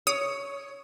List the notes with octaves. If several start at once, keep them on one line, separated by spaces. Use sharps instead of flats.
C#5 D#6